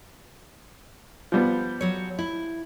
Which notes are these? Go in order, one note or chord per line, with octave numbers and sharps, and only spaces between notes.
F3 G3 B3
F#3 C#5
E4